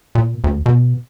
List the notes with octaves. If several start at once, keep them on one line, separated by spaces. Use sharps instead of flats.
A#2
D2
B2